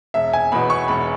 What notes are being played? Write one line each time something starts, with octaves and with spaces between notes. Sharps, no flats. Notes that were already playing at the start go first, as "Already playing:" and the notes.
E1 E5
G#5
E2 B2 B5
C#6
E1 B5